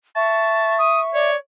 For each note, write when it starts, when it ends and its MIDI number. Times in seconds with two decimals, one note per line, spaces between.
0.16 1.30 76
0.16 0.76 81
0.16 1.12 85
0.79 1.00 87
1.14 1.35 73
1.14 1.36 74